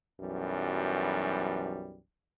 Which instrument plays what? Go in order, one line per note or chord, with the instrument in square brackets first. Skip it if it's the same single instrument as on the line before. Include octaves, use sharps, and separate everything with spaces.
[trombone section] B1 F#2 E3 G3